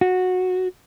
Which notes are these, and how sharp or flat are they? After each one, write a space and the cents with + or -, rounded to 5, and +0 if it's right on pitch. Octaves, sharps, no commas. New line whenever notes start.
F#4 -10